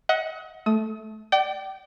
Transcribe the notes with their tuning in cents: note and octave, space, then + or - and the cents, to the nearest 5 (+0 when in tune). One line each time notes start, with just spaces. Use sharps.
D#5 +40 F#5 +0
A3 -10 D#6 +30
D5 +15 G5 -35